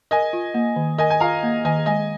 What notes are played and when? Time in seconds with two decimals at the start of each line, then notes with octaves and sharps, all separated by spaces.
0.11 A#4 D#5 G#5
0.33 F4
0.54 A#3
0.76 D#3
0.98 A#4 D#5 G#5
1.10 G#5
1.20 F4 F5 A#5
1.43 A#3
1.65 D#3 D#5 G#5
1.86 G#3 D#5 G#5